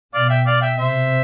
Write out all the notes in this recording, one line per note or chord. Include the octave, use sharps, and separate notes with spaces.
B2 D5 F5
E5 G5
D5 F5
E5 G5
C3 C5 E5